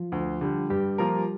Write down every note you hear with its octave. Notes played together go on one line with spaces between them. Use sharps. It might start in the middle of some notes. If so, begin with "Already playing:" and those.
Already playing: F3 F4
D2
D3 G3
G2 G3 G4
F3 A#3 F4 A#4